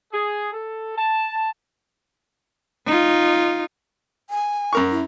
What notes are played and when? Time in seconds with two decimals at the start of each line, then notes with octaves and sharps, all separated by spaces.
0.12 G#4
0.52 A4
0.96 A5
2.86 D#4 F4
4.30 G#5
4.73 F#2 A#4 C#6
4.91 E4